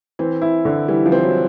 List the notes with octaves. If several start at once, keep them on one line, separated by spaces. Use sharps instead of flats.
E3 C4
E4
D3
E3 G3
F3
C4
F#3